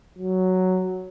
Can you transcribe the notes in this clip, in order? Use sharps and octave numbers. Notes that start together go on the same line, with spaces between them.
F#3